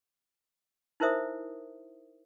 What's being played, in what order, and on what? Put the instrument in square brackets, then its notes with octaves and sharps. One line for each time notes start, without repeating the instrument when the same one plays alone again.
[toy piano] D#4 E4 A#4 C5 E5 D#6